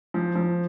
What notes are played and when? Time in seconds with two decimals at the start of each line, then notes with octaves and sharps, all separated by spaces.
0.14 F3
0.35 F3